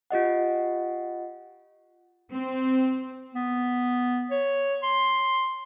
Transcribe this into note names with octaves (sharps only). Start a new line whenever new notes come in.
F4 G4 D#5 F#5
C4
B3
C#5
C6